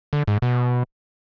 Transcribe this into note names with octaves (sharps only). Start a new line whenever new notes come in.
D3
G#2
B2